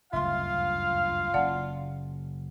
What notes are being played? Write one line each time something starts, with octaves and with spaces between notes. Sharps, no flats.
F#1 D2 G2 F4 E5 F5 C6
F#1 C#3 D5 F#5 A5